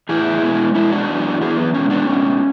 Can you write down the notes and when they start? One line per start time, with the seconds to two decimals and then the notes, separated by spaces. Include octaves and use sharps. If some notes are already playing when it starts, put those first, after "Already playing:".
0.09 A2 E3 B3 E4 G#4
0.42 B2 G#3 B3
0.75 B2 G#3 B3 C#4 E4
0.92 D4 F#4
1.08 F#2 E3 B3
1.41 F#2 E3 B3 E4 G#4
1.57 B3
1.74 B2 G#3 B3 C#4
1.90 B3 D4
2.07 B2 G#3 B3 C#4